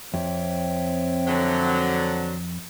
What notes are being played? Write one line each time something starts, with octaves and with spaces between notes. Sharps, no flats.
F2 C4 C#5 E5 G5
D3 F#3